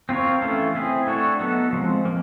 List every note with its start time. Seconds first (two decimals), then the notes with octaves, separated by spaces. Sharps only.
0.09 C4 F4 A#4 C#5
0.41 E3 A3 C#4 F4 A4
0.75 C4 E4 G#4
1.07 A3 D4 F#4 A4 C#5
1.39 F#3 B3 D#4 F#4 A4
1.73 F3 G#3 C4
2.05 A#3